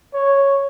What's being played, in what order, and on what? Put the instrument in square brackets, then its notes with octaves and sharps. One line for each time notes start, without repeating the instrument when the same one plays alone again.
[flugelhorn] C#5